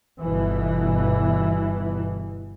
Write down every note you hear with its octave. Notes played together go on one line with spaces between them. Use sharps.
G1 B2 E3